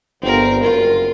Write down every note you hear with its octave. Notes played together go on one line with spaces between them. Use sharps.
G1 C4 A#4
F#1 F4 A#4